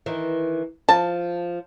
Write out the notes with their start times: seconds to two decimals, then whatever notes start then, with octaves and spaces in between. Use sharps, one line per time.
0.06 D#3 E3
0.89 F3 A5